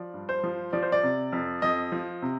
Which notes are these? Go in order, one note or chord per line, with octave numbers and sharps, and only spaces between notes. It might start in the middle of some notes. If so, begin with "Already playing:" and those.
Already playing: F3 D5
G2
C5
F3
F3 D5
C5
D5
C3
F2
F2 D#5
F3
C3